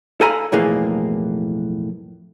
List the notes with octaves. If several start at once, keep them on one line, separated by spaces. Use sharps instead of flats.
A4 F5 G#5 A#5 B5
B1 F2 A2 E3 A#3 G#4